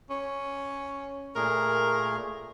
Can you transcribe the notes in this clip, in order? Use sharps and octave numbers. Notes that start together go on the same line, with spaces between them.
C#4
A#2 A3 G#4 A#4